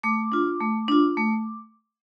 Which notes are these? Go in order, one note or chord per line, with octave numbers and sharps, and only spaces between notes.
A3 D6
D4 F4
A3
D4 F4
A3